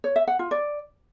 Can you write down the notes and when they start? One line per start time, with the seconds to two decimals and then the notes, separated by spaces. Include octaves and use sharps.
0.04 C#5
0.16 E5
0.27 F#5
0.39 F4
0.51 D5